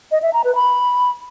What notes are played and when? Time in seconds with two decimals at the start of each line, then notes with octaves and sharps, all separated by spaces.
0.11 D#5
0.22 E5
0.33 A#5
0.44 B4
0.55 B5